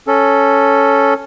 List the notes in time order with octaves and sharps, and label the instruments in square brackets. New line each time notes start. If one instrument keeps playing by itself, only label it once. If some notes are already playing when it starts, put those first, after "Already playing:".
[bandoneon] C#4 A4